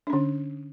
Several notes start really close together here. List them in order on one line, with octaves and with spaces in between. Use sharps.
D4 C#4 D3